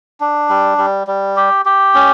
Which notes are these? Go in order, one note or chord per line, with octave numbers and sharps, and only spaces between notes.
D4
G3
G3
G3
G4
G4
C#4